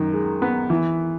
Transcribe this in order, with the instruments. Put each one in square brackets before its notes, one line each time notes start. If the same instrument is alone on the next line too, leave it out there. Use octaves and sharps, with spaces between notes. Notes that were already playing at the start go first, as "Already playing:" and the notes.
Already playing: [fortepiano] F#2 D#3
G#3
B3
E3